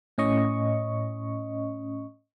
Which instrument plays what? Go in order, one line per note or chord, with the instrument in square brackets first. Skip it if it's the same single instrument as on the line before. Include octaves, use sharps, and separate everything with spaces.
[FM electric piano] A2 C#4 D#5 C#6